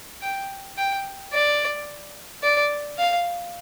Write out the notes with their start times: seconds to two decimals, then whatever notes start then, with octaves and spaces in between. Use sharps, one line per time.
0.22 G5
0.78 G5
1.33 D5
2.43 D5
2.98 F5